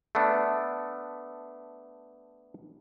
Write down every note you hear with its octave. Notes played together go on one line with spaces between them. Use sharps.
A3 B3 D4